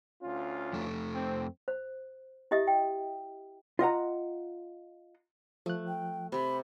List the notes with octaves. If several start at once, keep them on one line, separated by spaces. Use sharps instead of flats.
D2 C#4 F4
F2 A3
C4
C5
E4 G4 D#5 E5 D#6
G5
F4 D#5 F#5 A#5
F3 A3 F#6
G5
C3 G4 B5